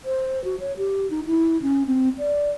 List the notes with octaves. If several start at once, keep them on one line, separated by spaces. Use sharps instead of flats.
C5
F#4
C#5
G4
D#4
E4
C#4
C4
D5